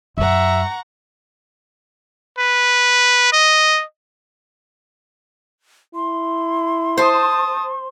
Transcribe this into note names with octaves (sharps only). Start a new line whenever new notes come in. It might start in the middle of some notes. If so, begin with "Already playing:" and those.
F#2 F#3 E5 F#5 A#5 C#6
B4
D#5
E4 C6
C5 A5 D#6